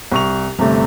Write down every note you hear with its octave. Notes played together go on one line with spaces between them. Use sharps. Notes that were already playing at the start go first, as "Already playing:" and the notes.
C2 C#6 F7
G1 C3 A3